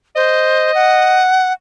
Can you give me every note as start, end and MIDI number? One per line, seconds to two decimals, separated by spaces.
0.16 0.71 72
0.16 1.25 75
0.75 1.53 78